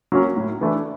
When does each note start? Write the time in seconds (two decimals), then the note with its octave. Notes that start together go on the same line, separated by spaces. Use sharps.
0.12 F#3 A#3 C#4
0.37 A2
0.61 E3 A3 D4